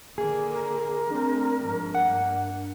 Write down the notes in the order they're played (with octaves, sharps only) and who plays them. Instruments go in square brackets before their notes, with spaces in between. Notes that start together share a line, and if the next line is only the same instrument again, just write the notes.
[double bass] D3 A#3 [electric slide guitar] G#4
[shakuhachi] A#4
[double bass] A3 C4 [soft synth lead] D4
[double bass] G#2 F3
[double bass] G2 A#3 [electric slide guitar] F#5